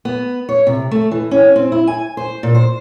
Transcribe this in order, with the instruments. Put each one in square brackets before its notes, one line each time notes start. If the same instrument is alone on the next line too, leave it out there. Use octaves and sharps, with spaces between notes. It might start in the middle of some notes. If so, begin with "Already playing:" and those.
[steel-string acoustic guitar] B3
C#5
C3
A3
E3
C#4
C4
E4
G#5
C5
A#2
C5